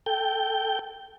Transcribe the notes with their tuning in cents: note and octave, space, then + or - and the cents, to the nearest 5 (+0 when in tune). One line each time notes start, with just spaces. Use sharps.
A4 +0 G5 +0